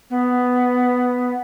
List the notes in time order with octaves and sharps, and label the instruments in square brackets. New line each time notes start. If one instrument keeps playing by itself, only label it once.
[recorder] B3